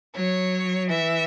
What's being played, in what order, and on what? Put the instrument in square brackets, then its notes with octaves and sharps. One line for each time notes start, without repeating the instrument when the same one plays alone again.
[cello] F#3 [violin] C#5
[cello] E3 [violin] E5